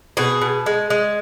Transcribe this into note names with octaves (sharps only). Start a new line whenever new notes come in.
B2 G#4
B2
G#3
G#3